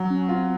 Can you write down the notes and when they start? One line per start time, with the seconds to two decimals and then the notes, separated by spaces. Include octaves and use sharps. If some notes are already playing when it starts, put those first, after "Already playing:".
Already playing: F#3
0.10 C#4
0.29 C4 F4